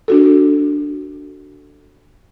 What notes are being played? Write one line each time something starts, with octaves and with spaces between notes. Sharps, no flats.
D4 F#4 A4